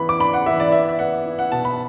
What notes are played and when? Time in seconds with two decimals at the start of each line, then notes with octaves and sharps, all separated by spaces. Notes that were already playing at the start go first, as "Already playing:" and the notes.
Already playing: E3 B3 B5
0.09 D6
0.20 D4 B5
0.33 F#5
0.46 E3 E5
0.60 D5
0.72 B3 E5
0.89 E5
0.99 B3 F#5
1.26 E4
1.39 F#5
1.52 B2 A5
1.65 B5